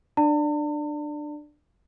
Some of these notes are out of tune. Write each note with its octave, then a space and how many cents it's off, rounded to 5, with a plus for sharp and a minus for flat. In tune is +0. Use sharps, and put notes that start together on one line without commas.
D4 +20 D5 +0 A5 +45